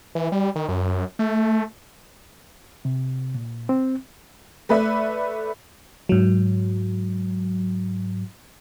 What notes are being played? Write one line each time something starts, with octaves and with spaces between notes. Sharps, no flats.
E3
G3
D#3
F#2
A3
C3
A#2
C4
A3 B4 D5 E5
G#2 F#3